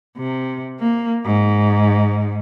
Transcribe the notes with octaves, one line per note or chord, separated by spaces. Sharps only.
C3
A#3
G#2